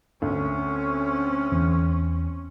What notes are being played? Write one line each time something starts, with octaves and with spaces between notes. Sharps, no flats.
D2 C4 C#4
E2